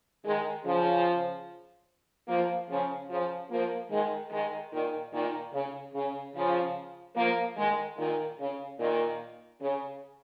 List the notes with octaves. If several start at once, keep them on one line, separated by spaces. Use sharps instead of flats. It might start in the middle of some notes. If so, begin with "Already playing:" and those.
D#3 G#3
C#3 F3
F3 A#3
C#3 F3
C#3 F3
F3 A#3
D#3 G#3
D#3 G#3
A#2 D#3
A#2 D#3
C#3
C#3
C#3 F3
F3 A#3
D#3 G#3
A#2 D#3
C#3
A#2 D#3
C#3